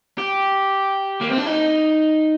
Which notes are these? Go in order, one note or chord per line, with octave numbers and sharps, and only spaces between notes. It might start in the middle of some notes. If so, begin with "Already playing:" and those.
G4
A#3
C4
D4
D#4